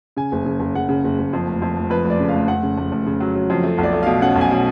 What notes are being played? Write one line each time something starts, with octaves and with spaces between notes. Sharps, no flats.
C#3 G#5
F#1
C#3
F#1
F#1 F#5
C#3
F#1
F#1
F2
F1
F2
F1
F2 B4
F1
D5
C#3
F5
F1
F1 F#5
C#3
F1
F1
C#3
F#3
F#3
F2
A3
B1
D5
A3
F5
B2
C#4 F#5
B1
G#5
B2